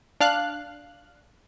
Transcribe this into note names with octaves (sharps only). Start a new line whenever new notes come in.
D4 F5 F#6